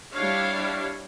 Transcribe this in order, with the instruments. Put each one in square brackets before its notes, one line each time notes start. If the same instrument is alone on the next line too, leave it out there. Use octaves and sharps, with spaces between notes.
[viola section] G3 D4 E4 C#5 F5